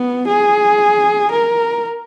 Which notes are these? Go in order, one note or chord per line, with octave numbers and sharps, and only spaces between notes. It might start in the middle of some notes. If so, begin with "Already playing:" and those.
Already playing: B3
G#4
A#4